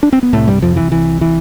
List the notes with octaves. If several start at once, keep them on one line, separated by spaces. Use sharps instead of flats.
D4
C4
B3
C2 A2 C3 A3
G2 G3
F2 F3
E3
E3
E3